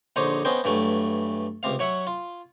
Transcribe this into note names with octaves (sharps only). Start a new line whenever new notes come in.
A#1 D3 D#4 C5 C#5 D#6
B3 C#4 C5 D#5 G5
G2 E3 F#3 A3
C#2 C3 F5
F#3 C#5 E5 F#5
F4